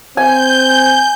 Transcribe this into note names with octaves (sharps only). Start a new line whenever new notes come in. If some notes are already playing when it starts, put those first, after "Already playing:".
C4 G#5 G6